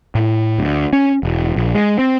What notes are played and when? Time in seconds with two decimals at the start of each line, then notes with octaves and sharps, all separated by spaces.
0.15 A2
0.58 D2
0.93 C#4
1.23 E1
1.56 A#1
1.75 G#3
1.99 C4